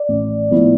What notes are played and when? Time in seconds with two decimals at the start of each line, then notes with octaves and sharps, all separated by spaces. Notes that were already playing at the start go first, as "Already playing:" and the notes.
Already playing: D5
0.09 A1
0.51 A2 F3 B3 E4